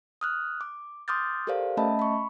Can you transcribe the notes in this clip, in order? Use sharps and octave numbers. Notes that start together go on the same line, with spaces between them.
D#6 F6 F#6
D6
C6 D6 D#6 F6 G6 A6
G4 A4 A#4 C5 D5 F5
A3 C#4 D#5 E5 A5 B5
B5 C#6